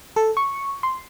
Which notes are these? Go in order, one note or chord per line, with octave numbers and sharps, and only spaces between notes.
A4
C#6
C6